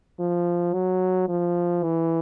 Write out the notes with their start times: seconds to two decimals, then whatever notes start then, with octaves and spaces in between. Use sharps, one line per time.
0.20 F3
0.74 F#3
1.28 F3
1.83 E3